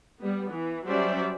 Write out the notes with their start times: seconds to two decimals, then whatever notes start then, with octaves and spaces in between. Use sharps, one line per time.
0.20 G3 B3
0.53 E3
0.88 F#3 G3 C#4 C5 D5 E5